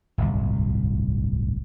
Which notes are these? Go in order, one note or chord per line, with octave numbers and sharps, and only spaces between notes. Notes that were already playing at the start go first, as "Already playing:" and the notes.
D1 G1 C2